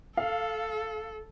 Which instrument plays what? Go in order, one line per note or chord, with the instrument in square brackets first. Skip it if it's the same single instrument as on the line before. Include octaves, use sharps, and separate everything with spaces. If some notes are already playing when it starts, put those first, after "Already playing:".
[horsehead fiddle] A4 [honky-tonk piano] F5